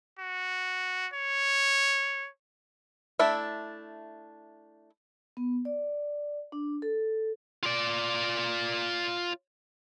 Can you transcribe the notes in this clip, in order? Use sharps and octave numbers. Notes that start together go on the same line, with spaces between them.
F#4
C#5
A3 D4 E4 E5
B3
D5
D4
A4
F4 D5